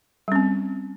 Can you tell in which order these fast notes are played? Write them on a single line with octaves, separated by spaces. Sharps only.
G3 C#4 C4